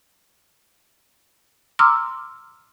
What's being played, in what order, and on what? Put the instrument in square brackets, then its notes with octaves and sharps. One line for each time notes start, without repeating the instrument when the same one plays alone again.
[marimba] A#5 C6 D6 E6 F6